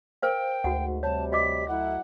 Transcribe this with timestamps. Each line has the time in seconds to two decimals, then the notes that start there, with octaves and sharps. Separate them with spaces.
0.22 A#4 C5 F5 G5
0.64 D2 G#2 A3 F#4 F#5
1.03 C3 G3 C#5 A5
1.32 F#4 D#5 D6 B6
1.68 F#3 A3 E4 F#5